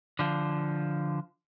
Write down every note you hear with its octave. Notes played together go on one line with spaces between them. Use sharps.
D3 F3